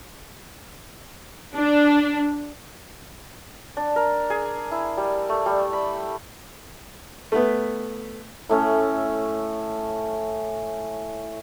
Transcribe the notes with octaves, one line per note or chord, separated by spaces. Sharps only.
D4
D4
A#4
G#4
E4
G3
A3
G3
B5
A3 B3
A2 A3 C#4